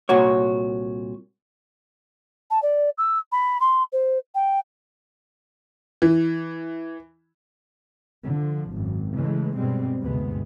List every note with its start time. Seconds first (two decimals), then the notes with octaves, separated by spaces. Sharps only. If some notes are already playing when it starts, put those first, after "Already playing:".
0.09 C2 A#2 F#4 C#5
2.50 A5
2.62 D5
2.98 E6
3.32 B5
3.60 C6
3.92 C5
4.34 G5
6.02 E3
8.24 D3 F3
8.72 G#1 F#2
9.13 C#3 E3 G#3 A3
9.56 G2 B2 G3 G#3 C4
10.02 D2 G2 C3 G#3 B3